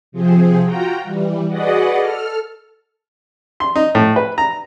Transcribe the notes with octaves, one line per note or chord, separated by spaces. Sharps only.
C3 F3 C4 G#4
F4 F#4 G5 A#5
E3 G3
F#4 G#4 B4 D5 D#5 F#5
A4 F6
C6
D#4
A2
B4
A#5